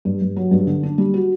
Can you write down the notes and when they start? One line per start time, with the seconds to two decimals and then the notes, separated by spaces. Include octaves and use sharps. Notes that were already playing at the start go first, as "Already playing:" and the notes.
0.05 G2
0.22 G2
0.36 F#3
0.51 G2
0.67 D3
0.83 D4
0.98 G3
1.14 F#4